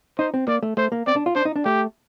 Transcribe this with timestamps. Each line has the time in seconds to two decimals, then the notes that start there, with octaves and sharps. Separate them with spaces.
0.19 D#4 C5
0.34 C4
0.48 A#3 D5
0.63 A3
0.77 A3 C5
0.92 A#3
1.06 C4 D5
1.16 D4
1.26 F4
1.35 D4 C5
1.45 D#4
1.56 D4
1.65 A3 G4